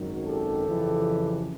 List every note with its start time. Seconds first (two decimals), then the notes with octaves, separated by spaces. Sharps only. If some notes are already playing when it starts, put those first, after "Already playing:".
Already playing: G#1 F#2 D#3 F#3
0.26 G4 A4
0.67 F2 C#3 E3